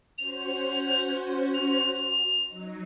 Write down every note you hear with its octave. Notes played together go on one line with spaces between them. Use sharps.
C#4 F#4 C5 F7
F7
F#3 D#4